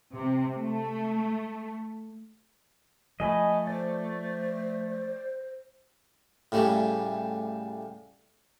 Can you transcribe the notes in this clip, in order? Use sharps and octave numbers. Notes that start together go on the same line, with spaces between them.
C3
A3
F3 A3 D#5 G#5 B5
C5 D5
A2 C#3 G3 A3